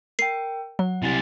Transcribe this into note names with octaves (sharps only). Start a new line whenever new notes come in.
A#4 G5 C7
F#3 F#5
C3 G3 E4 G#5 A6